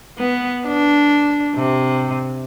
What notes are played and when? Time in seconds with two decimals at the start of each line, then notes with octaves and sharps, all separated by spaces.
0.18 B3
0.67 D4
1.56 C3